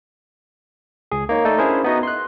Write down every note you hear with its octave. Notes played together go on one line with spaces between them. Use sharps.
C#2 G#4
A#3 D#4 C#5
A3 D#4 A4 D5
C#4 D4 E4 G#4 A#4 C5
B3 D#4 F#4 D#5
C6 F#6